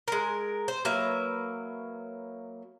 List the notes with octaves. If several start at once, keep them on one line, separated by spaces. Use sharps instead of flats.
G#3 A#4
C5
F#3 A#3 B4 E5